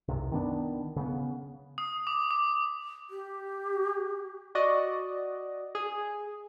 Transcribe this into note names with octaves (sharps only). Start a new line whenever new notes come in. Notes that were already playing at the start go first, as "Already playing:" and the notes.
C2 F#2 C3
D#3 B3 D4
C#3 B3
D#6
D6
D6
G4
F#4 D5 D#5
G#4